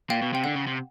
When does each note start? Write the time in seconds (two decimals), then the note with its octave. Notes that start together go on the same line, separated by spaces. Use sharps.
0.10 A#2 F5 G5
0.22 B2
0.33 C3 G5
0.44 D3 F#5
0.56 C#3
0.67 C3